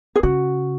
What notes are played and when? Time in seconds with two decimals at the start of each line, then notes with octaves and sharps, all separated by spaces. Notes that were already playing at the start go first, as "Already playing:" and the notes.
0.16 G#4
0.23 C#3 F#4